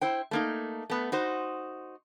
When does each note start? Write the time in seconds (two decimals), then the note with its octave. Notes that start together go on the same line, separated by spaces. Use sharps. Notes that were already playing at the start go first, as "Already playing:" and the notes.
0.01 E4 C5 G5
0.31 A3 A#3 D#4
0.90 A3 B3
1.12 D#4 F#4 C5